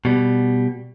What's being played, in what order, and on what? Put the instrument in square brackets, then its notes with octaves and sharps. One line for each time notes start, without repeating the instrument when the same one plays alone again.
[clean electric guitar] B2 G3